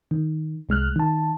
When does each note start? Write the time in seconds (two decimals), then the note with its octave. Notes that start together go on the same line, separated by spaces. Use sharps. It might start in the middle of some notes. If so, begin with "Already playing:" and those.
0.11 D#3
0.69 C2 G#3 F6 F#6
0.96 D#3 A5